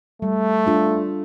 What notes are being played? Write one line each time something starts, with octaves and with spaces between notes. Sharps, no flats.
G3 A3
D4 F4 A4